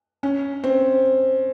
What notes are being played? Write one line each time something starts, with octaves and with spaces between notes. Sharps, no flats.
C#4
C4